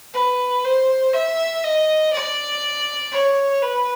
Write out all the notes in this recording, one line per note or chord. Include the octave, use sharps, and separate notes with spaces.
B4
C5
E5
D#5
D5
C#5
B4